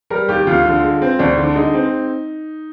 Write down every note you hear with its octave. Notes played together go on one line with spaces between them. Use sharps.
G3 A#4
D#2 G4
D2 F4
D3
G#3
C4
D2 D4
D3
G#3 D#4
C4